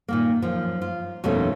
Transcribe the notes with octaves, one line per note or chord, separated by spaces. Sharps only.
A#2 D#3 A#3
F#2 F3
F4
F2 B2 D#3 A3 C#4